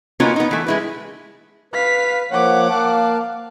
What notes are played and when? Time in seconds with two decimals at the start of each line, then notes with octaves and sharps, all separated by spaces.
0.20 A#3 B3 C#4 D#4 F4 F#4
0.36 B3 D#4
0.51 E3 A3
0.67 G#3 E4 B4
1.74 B4 F5 B6
2.32 F3 A#3 C#5 F#5 D6
2.70 A#3 F5 A5